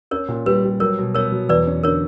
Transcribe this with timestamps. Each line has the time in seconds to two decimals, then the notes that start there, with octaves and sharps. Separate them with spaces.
0.11 C#4 A#4 C#5
0.29 A#2
0.46 G3 B4
0.64 G3
0.80 F#3 A#4 C#5
0.98 B2
1.15 B3 A#4 C#5
1.32 F#3
1.49 E2 B4 D5
1.67 C#4
1.84 D3 A#4 C#5